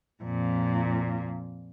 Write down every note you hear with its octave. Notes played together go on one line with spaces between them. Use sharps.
F2 A#2